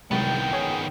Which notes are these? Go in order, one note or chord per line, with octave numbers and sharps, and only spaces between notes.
C2 C3 D#3 F#3 G#3 B3 G5 A6
G#4 C#5